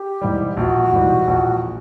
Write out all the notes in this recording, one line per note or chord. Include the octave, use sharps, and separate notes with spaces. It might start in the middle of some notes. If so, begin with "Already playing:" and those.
Already playing: G4
G#2 E3 G3
A#1 F#4
G#2 E3 G3
A#1